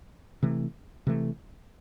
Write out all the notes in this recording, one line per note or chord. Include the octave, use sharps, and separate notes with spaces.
C3 E3 A3
C3 E3 A3